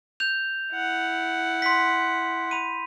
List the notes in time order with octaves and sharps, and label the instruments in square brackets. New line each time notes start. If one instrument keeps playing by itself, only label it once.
[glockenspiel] G6 F7
[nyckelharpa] E4 F#5
[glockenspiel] C6 B6
B5 D#7